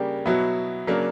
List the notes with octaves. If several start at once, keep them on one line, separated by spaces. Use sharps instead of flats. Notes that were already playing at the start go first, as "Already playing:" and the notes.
Already playing: C#3 G3 A#3 D4 G4
B2 F#3 B3 E4
C#3 F#3 A#3 D4